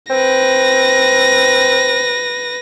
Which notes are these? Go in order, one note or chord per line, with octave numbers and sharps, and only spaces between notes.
C4 B4 A#6